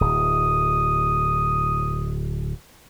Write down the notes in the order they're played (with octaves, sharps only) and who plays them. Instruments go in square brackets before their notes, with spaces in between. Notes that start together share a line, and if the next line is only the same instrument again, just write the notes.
[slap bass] D1 [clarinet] D#6